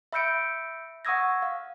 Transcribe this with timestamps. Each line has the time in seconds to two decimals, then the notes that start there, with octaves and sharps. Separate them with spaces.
0.12 E5 B5 E6 G6 C#7 D7
1.05 F#5 C#6 D#6 E6 G#6 A#6
1.42 F5